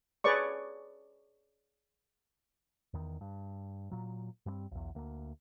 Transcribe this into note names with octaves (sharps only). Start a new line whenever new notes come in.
G#4 B4 C#5 D5 C#6
E2 D#3
G2
A#2 F#3
G2 G3 A#3 C4
B1 E2
D2 A#3